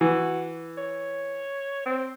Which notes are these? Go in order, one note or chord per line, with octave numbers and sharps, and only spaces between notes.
E3 F#4
C#5
C4